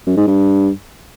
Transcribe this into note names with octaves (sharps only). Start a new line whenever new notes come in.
F#2
G#2
G2